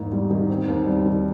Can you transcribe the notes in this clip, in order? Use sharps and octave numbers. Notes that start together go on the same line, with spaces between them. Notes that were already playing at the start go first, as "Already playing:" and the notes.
Already playing: E2 G#2 A#3
G3
D#3
C4
D#2
G3
D#3